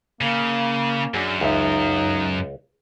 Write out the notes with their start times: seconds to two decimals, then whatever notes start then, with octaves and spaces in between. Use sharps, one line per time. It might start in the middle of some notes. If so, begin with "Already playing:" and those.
0.21 C#3 A#3
1.14 F#2 D4 F#4 G#4
1.41 C#2 D#4 E5